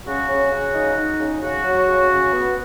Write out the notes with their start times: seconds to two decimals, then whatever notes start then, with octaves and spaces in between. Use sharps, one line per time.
0.06 C#3 F#4
0.29 C#3
0.51 C#3
0.75 D#4
0.97 D#4
1.19 C#3
1.42 C#3 F#4
1.64 F#3
1.87 C#3
2.10 C#3
2.32 B3